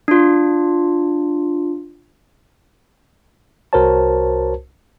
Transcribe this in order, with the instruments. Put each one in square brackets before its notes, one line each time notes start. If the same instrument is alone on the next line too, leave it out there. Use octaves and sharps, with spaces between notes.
[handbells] D4 F4
[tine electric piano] C2 F#4 A#4 C5 C#5 A5